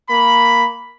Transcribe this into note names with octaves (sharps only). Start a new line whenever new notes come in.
A#3 B5